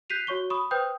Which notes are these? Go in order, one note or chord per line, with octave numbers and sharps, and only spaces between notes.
F#6 G6 B6 C7 D#7 F7
F#4 C#5 C#6 G7
B5 C#6 D#6
B4 C5 G5 D#6 G6